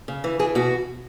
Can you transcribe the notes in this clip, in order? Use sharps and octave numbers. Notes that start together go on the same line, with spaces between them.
C#3
E3
E3 G#4
B2 F#4